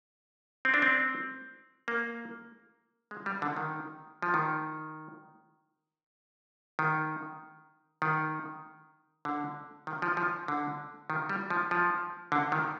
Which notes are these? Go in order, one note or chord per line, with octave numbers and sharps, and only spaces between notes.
C4
D4
C4
A#3
G#3
G3
D3
D#3
F3
D#3
D#3
D#3
D3
D#3
F3
F3
D3
D#3
G3
F3
F3
D3
D#3